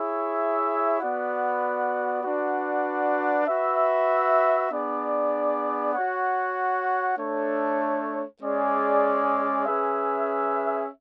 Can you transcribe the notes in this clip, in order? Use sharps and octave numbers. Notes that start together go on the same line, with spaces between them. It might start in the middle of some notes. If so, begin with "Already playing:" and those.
Already playing: E4 G#4 C#5 E5
B3 F#4 B4 D5 F#5
D4 F#4 B4 D5 F#5
F#4 B4 E5
B3 D4 G#4 D5
F#4 C#5 F#5
A3 D4 A4 C#5
G#3 C#4 G#4 D5
C#4 G#4 B4 E5